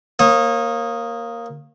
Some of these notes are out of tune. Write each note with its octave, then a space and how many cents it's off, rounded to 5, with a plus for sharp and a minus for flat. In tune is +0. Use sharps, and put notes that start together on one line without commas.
A#3 +0 C#5 -35 D#6 +0